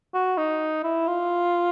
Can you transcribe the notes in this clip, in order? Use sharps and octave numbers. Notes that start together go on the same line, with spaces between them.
F#4
D#4
E4
F4